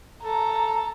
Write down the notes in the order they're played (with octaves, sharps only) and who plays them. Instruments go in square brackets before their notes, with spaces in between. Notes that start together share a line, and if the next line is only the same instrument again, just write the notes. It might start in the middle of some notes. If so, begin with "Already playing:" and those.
[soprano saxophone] A4 [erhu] A#5